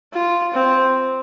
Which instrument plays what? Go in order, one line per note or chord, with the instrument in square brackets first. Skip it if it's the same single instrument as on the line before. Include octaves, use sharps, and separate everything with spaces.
[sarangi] F4
C4